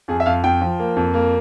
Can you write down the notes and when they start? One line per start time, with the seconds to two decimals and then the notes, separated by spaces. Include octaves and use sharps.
0.08 F2 G#4
0.20 E5
0.26 F2 F5
0.44 F2 G5
0.61 F3
0.79 A#3
0.96 F2
1.14 A#3